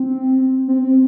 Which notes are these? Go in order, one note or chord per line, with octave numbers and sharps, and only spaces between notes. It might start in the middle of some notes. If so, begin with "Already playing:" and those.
Already playing: C4
C4
C4